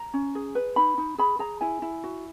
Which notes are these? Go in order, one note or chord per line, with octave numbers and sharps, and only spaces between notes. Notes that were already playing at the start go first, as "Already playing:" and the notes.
Already playing: A#5
C#4
G#4
B4
D#4 B5
D#4
G#4 B5
G#4 A#5
E4 G#5
E4
F#4